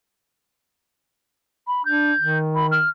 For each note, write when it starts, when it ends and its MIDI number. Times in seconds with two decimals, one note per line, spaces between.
1.67 1.85 83
1.85 2.13 62
1.85 2.38 91
2.19 2.84 51
2.55 2.67 83
2.71 2.89 89